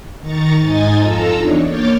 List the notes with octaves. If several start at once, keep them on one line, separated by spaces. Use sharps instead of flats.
D#3 A#5 C#6 A6
G#2 D#4 D#5 G#5 G#6 A6
F2 F4 A4 A#5 E6
E2 D4 D#4 C#5
A#3 C#5 D6 F6 G6 A6